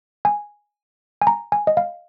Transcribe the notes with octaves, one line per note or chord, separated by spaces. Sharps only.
G#5
G#5
A#5
G#5
D#5
F5